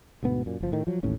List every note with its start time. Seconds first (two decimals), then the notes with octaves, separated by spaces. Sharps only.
0.23 D2 G#2 B2 B3
0.46 F#2 A#2
0.61 F#1 F3
0.72 A2 D#3
0.87 F3 F#3
1.03 A1 D#2 A2 C#4